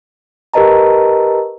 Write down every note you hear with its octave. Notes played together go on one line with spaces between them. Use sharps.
G4 A#4 B4 D#5 A5 A#5